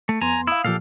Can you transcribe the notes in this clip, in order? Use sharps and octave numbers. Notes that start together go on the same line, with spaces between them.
A3
F2 B3 G#5 A#5 C6
E4 F5 D#6
A#2 F3 G4 A4 F5